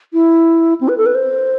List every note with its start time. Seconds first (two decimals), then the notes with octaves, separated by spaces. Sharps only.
0.13 E4
0.81 C4
0.88 B4
0.98 A4
1.06 B4
1.15 C5